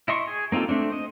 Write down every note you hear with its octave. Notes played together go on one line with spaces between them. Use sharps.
E4 D#5 C6 C#6
G#4
A#3 C4 D#4 F4 A4
A3 C4 D4
C5 D#5